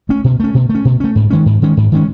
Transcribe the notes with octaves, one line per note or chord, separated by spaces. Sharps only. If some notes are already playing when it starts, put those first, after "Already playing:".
A3 C#4
B2
A3 C#4
B2
A3
C#4
B2
A3 C#4
G#2
D#3 G#3 C#4
G#2
D#3 G#3 C#4
G#2
D#3 G#3 C#4